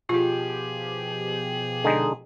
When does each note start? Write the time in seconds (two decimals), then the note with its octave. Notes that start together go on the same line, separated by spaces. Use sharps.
0.09 B2 F3 F4 G4 G#4
1.84 D3 G#3 D#4